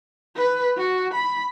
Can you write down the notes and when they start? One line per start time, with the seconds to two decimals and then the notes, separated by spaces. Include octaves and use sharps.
0.36 B4
0.77 F#4
1.13 B5